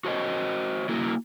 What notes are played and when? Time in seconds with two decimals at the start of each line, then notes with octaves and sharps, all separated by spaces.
0.05 F#4 C5 C#5 D#5
0.89 A#3 E4 F#4